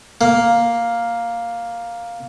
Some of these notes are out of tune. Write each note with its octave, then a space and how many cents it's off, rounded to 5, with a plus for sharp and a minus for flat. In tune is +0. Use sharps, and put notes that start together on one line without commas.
A#3 +5